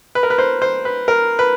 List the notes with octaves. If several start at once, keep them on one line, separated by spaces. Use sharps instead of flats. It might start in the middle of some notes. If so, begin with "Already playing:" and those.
B4
A#4
B4
C5
C5
B4
A#4
B4